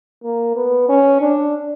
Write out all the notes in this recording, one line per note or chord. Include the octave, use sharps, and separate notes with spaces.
A#3
B3
C#4
D4